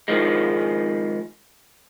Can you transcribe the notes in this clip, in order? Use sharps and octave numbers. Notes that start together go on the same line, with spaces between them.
G#2 D#3 F3 G#3